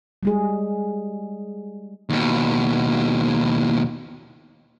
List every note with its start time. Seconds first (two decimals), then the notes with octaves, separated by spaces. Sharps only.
0.23 G3 G#3 G#4
2.10 D#2 B2